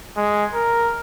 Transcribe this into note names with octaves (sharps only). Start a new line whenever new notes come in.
G#3
A#4